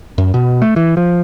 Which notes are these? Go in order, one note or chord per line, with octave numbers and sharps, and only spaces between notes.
F#2
B2
A3
E3
F3